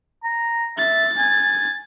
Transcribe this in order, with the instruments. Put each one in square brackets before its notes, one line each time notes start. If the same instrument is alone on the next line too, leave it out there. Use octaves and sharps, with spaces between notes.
[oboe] A#5
[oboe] E5 [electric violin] A6
[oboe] G#5